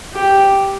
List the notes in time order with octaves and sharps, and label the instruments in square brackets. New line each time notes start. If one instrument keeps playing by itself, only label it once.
[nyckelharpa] G4